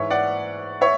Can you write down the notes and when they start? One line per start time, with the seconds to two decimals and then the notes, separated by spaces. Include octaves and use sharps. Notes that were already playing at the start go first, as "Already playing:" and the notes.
Already playing: G#2 E3 C#5 E5
0.10 D5 F#5
0.81 C#5 E5